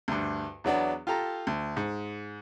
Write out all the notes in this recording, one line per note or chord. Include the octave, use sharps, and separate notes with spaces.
D2 G2
E2 F#3 B3 D4
F4 G4 A4 A#5
D2
G#2